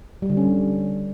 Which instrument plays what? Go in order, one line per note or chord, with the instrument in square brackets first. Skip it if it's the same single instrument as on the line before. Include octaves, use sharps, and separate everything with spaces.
[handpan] G3
D3
C#4